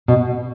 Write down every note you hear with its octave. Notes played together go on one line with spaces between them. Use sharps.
B2